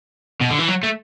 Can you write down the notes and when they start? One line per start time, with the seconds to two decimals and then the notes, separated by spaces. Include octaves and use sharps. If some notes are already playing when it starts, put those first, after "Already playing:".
0.41 B2
0.50 D3
0.58 E3
0.68 F#3
0.83 A3